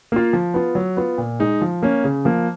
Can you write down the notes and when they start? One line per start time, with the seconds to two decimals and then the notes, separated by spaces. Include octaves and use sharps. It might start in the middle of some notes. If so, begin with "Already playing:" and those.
0.12 A#3 F4
0.33 F3
0.54 B3 F4
0.75 F#3
0.97 B3 F4
1.18 A#2
1.39 G#3 D#4
1.61 F3
1.82 A#3 C#4
2.04 C#3
2.25 F3 A#3